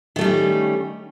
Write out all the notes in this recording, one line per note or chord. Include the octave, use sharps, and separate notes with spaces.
D#3 G3 A3 C#4